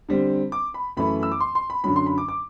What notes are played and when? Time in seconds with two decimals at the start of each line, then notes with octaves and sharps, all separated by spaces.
0.09 D3 G3 C4
0.52 D6
0.74 B5
0.97 F#2 E3 A3 B5
1.23 E6
1.32 D6
1.40 C6
1.55 C6
1.70 B5
1.84 F#2 D3 F#3 B5
1.96 C6
2.06 B5
2.18 D6
2.28 D6